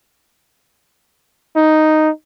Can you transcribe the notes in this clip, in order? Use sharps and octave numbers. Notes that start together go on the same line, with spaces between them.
D#4